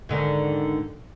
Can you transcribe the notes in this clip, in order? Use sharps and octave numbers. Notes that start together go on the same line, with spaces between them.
G#2 D3 D#3